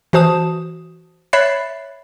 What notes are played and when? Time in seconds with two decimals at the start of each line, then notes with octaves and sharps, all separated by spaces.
0.13 E3 F#4 C5 A5 D#6 E7
1.33 C#5 E5 B5 F#6 A6 C7